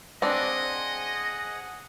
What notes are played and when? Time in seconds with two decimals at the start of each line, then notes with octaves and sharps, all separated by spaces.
0.22 C4 D4 G#4 D#5 F#5